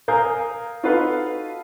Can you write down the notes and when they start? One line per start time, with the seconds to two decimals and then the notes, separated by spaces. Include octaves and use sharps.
0.08 A#4 F5 G#5 A#5 D#6 G6
0.83 D#4 F4 F#4 A4 B4 F5